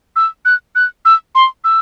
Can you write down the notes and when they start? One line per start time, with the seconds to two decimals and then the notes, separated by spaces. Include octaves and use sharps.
0.16 E6
0.45 F#6
0.75 F#6
1.05 E6
1.35 C6
1.64 E6